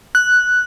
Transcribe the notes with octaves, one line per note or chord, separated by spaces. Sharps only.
F#6